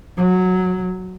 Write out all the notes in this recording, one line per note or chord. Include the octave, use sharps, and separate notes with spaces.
F#3